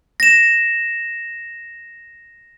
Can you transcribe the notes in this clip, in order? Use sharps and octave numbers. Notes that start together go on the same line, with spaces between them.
A#6 E7